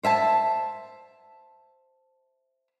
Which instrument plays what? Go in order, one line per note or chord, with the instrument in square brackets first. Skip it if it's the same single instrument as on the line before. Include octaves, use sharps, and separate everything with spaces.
[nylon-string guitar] C5 E5 G#5 A5